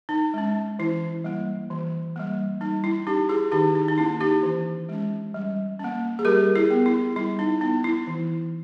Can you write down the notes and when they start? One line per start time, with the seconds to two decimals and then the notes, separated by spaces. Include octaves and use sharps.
0.09 D#4
0.34 G#3 C#4
0.79 E3 E4
1.24 G3 A#3
1.70 E3
2.16 G3 A#3
2.61 G3 D#4
2.84 E4
3.07 C#4 D#4 G4
3.29 E4 G#4
3.52 D#3 D#4 G4
3.75 D#4
3.88 D#4
3.98 A#3 C#4 E4
4.21 D#4 G4
4.43 E3
4.89 G#3 C#4
5.34 G3
5.79 A#3 C#4
6.19 G#4
6.25 G3 G4 A#4
6.56 E4 G#4
6.71 B3
6.86 E4
7.16 G3 E4
7.39 D#4
7.61 B3 D#4
7.84 E4
8.07 E3